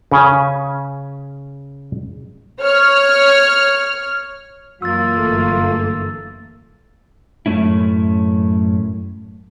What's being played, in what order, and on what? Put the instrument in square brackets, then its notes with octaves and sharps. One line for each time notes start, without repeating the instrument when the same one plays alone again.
[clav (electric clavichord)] C#3 C#4 G#5
[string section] C#5 F6
[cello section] F#2 E3 A#3 [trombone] F4 [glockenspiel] E6 A6
[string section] G1 A3
[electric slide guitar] F#2 A2 A3 C#4 E4